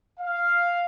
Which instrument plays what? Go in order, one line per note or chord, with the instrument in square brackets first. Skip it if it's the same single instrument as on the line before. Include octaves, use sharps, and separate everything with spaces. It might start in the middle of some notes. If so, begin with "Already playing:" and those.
[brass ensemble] F5